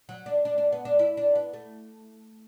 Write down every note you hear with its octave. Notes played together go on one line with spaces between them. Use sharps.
F#3
D4
D4
D4
B3
D4
E4
D4
B3
A3